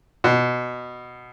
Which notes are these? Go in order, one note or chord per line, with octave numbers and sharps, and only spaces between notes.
B2